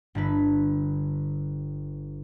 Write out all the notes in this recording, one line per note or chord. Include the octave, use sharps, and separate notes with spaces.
G1 D3 B4